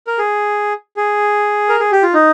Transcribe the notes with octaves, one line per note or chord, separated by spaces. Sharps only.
A#4
G#4
G#4
A#4
G#4
G4
F4
D#4